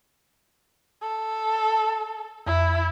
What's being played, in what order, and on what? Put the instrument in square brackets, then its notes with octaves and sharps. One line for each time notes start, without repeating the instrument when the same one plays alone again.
[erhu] A4
[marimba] F2 [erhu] E4